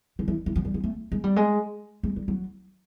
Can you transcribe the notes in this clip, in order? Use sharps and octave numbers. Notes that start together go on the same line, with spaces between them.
D#3
E3
E3
F3
G3
G#3
A3
G#3
G3
G#3
G#3
G3
F#3